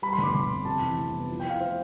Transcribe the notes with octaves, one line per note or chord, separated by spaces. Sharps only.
G3 B5
C6
G1
D6
G1 C6
F2
C3 A5
E3
C2
B3
F3
E4 G5
F5
E4 C5